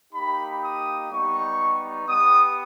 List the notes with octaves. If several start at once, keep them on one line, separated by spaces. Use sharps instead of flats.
A#3 D#4 G4 B5
D#6
G3 B3 D#4 G4 C#6
B3 G4 D#6